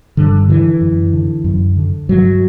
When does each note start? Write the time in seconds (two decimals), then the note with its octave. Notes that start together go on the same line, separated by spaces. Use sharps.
0.17 G2 D3
0.49 D3 E3
0.81 F#2
1.13 D3
1.44 F#2
1.77 D3
2.09 G2 F#3